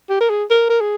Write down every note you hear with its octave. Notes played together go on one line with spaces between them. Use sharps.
G4
A#4
G#4
A#4
A#4
G#4